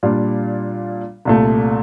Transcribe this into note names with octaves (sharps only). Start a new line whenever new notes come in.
A#2 G3 D4 F4
C2 A#2 A3